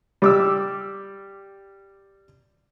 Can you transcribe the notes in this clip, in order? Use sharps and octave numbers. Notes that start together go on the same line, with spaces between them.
G3 D6 E6